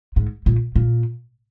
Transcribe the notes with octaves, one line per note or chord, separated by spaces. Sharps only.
G#2
A#2
A#2